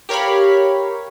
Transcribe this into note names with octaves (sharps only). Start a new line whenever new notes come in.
G4 A#4 C#5 F5 B5